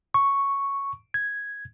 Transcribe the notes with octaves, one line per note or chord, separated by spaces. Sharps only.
C#6
G#6